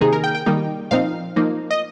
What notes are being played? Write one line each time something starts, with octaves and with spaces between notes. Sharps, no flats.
C3 D#3 A#3 D#4 G#4
A#4
G5
G5
D#3 G3 A#3 D#4
A#2 F3 C4 D#4 F5
F3 A#3 D#4
D#5